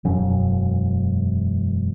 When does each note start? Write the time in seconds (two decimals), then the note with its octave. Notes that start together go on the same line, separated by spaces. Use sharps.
0.05 E1 F#2